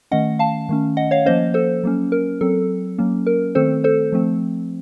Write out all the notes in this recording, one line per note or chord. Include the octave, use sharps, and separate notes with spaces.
D#3 A3 C#4 D#5 F#5
F5 A5
D#3 A3 C#4
D#5 F#5
C#5 F5
F3 A#3 C#4 C5 D#5
A4 C5
F#3 A#3 C#4
A#4
F#3 C4 A4
F#3 A#3 C#4
A#4
D#3 A3 C4 A4 C5
A4 C5
F3 A3 C4